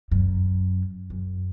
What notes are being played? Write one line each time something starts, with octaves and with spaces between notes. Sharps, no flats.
F#2
F#2